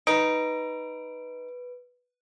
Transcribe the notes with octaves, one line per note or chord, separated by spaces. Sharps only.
D#4 B4 D7